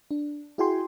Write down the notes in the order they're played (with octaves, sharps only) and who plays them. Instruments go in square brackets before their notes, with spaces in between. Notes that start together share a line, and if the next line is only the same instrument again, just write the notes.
[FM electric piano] D4
E4 F#4 G#4 G5 G#5 C6